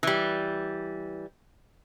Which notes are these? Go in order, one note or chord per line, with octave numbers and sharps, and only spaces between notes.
E3 G3